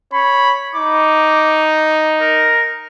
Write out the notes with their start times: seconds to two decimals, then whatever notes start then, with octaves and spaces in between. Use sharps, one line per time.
0.13 C#5 B5
0.75 D#4 D6
2.21 A#4